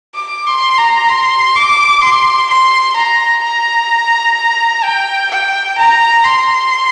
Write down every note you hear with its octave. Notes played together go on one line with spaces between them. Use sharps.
D6
C6
A#5
C6
D6
C6
C6
A#5
A#5
G5
G5
A#5
C6